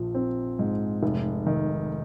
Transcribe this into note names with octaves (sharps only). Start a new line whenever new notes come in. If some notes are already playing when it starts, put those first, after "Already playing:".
Already playing: A#1 F3
C4
G#2
F1
D#3